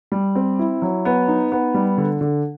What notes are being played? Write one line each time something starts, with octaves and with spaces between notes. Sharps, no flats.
G3
C4
E4
F#3
B3
D#4
B3
G3
D3
D3